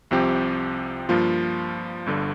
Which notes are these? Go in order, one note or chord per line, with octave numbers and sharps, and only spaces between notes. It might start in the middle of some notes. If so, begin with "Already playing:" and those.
C2 C3 F3 C4 G4
G2 F3 A#3 F4
G1 G2 D3